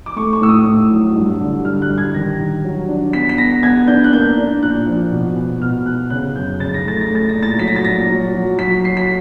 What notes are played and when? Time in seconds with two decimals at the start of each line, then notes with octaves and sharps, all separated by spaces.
0.06 D6
0.16 A3 C#6
0.33 C#6
0.41 A2 E6
0.49 D#6
0.65 A2
0.91 F#3
1.16 G2
1.40 D3
1.65 G2 F6
1.82 F#6
1.89 G2
1.98 G#6
2.14 D#3 A#6
2.40 D#3
2.64 F#3
2.88 D4
3.13 B3 B6
3.29 B6
3.38 B3 A#6
3.63 B3 G#6
3.87 D4 G6
4.04 F#6
4.13 A#3 G6
4.37 D4
4.62 A#2 F#6
4.86 F3
5.11 B2
5.36 B3
5.61 B2 F6
5.86 B3 F#6
6.10 C#3 F#6
6.36 F#2 G6
6.60 C#3 A6
6.74 A#6
6.85 A3 A6
7.01 A#6
7.10 A3 A6
7.29 A#6
7.35 A#2
7.43 A6
7.59 F#3 B6
7.68 A#6
7.76 A6
7.84 A#2 A#6
8.09 F#3
8.34 F#3
8.58 F#3 B6
8.83 F#3 C7
8.97 B6